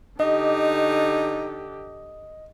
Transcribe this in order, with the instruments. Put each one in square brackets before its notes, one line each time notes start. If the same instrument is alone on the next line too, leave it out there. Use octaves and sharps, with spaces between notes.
[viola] D3 G4 [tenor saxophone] D#4 [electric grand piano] D#5